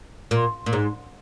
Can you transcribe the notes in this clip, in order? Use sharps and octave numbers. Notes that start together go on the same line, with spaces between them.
A#2
A#2
G#2